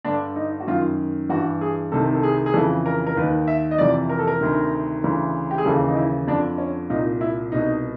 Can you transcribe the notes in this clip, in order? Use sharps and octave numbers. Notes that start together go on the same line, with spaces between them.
G2 D3 D4
D#4
F#4
F#2 D#3 F4
G2 E3 F#4
G#4
C2 C3 D#3 A4
A4
G#4
G#4
F2 C#3 E3 A4
A#4
A#4
D#2 D#3 B4
E5
D#5
F2 C3 E3 D5
A#4
A4
A#4
D2 C3 D#3
D2 C#3 E3
G4
G#4
D#2 C#3 E3 A4
D#4
E4
F2 D3 D4
C#4
C2 A#2 D#4
E4
C2 B2 D#4